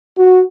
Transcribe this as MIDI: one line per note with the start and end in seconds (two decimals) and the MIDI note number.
0.18 0.42 66